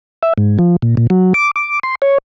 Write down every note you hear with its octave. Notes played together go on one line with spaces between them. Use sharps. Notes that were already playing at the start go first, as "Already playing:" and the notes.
E5
G#2
F3
A#2
A#2
F#3
D6
D6
C6
C#5